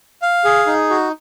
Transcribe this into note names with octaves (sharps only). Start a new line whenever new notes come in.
F5
G#4
D#4
F#4